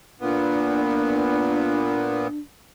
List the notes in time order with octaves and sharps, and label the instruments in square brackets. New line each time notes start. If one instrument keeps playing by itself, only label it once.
[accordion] A#2 B3 [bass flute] D4